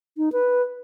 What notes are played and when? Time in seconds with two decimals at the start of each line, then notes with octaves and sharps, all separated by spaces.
0.17 D#4
0.32 B4